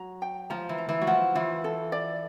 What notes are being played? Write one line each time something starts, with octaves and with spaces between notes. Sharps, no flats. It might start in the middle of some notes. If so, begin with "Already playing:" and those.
Already playing: F#3 A#5
G5
F3 A#5
E3
A#5
E3
F#3
F3 F#5
E3 F4
A4
D5